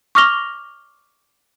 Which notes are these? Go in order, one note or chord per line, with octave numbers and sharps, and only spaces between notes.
C#6 D6 F6 A#6 F7 G7